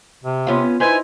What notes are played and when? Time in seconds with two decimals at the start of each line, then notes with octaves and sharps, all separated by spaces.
0.24 C3
0.47 B3 C#4 F4
0.80 D#4 E4 B4 C5 G#5